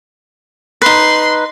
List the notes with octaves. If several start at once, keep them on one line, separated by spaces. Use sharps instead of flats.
D#4 B4 C6